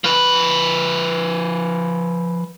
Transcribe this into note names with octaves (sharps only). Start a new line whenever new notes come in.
F3 B4